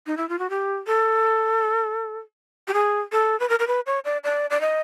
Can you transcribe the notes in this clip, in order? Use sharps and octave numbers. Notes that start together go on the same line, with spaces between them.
D#4
E4
F4
F#4
G4
A4
G4
G#4
A4
B4
A#4
A#4
B4
C#5
D5
D5
D5
D#5